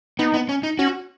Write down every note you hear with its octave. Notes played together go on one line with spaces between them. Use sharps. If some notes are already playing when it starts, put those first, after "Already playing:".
B3 D#4
B3
C#4
D#4
C#4 F#4